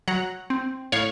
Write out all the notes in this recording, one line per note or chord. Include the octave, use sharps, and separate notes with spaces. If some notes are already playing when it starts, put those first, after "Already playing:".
F#3 F#5 A#5
C4
A2 C#5 F5